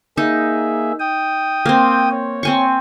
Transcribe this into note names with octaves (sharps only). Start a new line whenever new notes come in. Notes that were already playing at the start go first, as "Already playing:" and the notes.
A#3 D#4 G#4 E5
G5 D#6
A#3 C4
C#5
C4 G#5 C#6